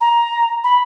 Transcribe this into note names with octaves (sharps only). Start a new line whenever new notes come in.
A#5
B5